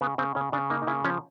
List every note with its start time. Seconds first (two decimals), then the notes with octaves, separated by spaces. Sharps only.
0.01 C#3 B3
0.18 C#3 C4
0.35 C#3 C#4
0.52 C#3 D4
0.70 A#3 D#4
0.82 D#4
0.87 C#3 E4
1.04 F3 C#4